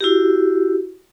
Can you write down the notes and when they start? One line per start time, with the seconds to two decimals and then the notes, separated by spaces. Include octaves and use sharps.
0.01 E4 F#4 G4